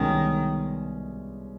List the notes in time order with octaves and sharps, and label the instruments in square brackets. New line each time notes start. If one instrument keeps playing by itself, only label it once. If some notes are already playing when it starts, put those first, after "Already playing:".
Already playing: [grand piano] C2 B2 G#3 C#4 [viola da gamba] D#3